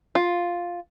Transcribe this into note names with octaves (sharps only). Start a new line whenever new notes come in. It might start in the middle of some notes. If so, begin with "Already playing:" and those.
F4